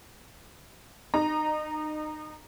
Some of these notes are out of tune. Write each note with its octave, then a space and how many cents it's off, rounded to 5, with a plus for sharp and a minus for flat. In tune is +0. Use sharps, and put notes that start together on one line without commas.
D#4 -30 A#5 +0